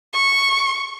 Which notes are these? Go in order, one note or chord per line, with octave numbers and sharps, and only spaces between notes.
C#6